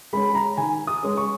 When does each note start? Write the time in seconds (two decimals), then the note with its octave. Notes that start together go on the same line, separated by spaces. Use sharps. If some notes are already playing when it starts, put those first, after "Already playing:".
0.13 G#3 C#4 B5
0.35 A#5
0.57 D#3 G#5
0.87 D#6
1.03 G#3 C#4
1.17 C#6